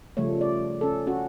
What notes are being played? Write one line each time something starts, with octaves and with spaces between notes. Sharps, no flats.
C#3 F3 G3 A3 C#5
D5
C#4 A4
C#4 F#4